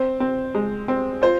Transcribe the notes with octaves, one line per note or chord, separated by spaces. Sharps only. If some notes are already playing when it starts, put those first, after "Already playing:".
Already playing: C4 C5
C4
G#3
C4
F4 C5